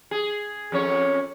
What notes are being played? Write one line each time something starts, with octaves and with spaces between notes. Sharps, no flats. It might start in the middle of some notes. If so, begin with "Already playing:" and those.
G#4
F2 C#4 C#5